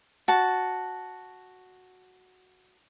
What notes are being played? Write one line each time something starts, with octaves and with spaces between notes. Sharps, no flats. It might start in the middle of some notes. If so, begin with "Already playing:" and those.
F#4 A5